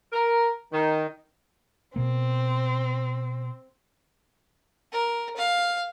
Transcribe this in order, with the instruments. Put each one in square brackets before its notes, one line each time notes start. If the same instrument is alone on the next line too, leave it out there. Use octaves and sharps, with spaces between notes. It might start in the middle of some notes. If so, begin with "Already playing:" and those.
[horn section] A#4
D#3
[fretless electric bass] B2 A#3 [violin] C4
[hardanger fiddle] A#4
F5